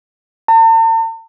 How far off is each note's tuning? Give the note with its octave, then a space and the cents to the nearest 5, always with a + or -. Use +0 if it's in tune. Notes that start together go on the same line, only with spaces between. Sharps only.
A5 +45